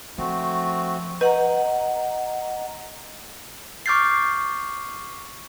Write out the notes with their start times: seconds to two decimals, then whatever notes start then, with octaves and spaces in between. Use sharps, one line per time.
0.18 F3 A3 C4 F#4
1.21 B4 D#5 F#5 A#5
3.86 C#6 D6 F6 G6 A6 C7